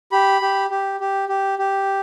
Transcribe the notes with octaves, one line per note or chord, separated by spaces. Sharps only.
G4 B5
G4
G4
G4
G4
G4